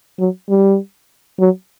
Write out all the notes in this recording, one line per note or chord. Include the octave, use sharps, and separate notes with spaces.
F#3
G3
F#3